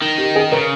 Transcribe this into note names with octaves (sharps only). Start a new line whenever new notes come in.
D#3
G4
G#4
C#3 A#4